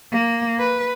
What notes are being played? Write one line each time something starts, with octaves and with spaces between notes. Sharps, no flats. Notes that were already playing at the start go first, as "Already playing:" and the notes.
A#3
B4